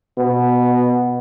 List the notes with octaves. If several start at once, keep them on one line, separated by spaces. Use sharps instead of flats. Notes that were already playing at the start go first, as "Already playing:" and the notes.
B2